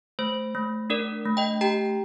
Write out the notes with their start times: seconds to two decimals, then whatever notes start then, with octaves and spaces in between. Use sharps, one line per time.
0.19 A3 C5
0.55 A3
0.90 D4 A#4 D5
1.25 A3
1.37 D#5 G5
1.61 G4 G5 A#5